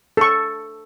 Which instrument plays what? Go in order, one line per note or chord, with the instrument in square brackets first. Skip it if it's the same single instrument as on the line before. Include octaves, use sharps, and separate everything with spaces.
[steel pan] A4 C#6